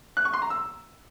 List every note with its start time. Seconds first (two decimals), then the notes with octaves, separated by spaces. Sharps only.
0.17 F#6
0.25 C#6
0.34 C6
0.42 A#5
0.50 E6